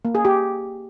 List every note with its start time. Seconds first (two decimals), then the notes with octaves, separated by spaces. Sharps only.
0.05 A#3
0.15 G#4
0.25 G4